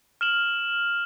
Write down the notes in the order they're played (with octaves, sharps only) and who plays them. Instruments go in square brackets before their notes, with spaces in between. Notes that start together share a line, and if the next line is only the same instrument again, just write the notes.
[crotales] F6 E7 F#7